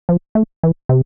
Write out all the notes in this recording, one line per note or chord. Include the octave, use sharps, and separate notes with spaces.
F3
A3
E3
C3